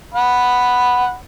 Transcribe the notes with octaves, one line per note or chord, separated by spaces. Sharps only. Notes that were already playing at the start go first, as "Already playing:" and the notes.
F#5 B5